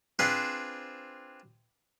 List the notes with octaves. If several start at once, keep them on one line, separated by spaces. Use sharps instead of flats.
C4 D4 F4 G#4 B4 C5